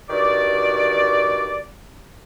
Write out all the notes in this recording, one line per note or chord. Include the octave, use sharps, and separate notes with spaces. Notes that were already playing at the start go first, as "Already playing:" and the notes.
G2 D#3 F#4 D5